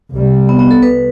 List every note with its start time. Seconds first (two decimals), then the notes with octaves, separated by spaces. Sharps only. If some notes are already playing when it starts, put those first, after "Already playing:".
0.14 C2 C3 G3
0.49 B3
0.59 B3
0.71 A4
0.83 B4